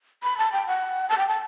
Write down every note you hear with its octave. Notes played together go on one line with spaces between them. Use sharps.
B5
A5
G5
F#5
A5
G5
A5